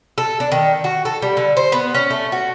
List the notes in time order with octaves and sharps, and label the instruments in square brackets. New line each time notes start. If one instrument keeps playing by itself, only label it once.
[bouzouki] A4
D4
D#3
F#4
A4
G3
D3
C5
B3
C#4
A3
F#4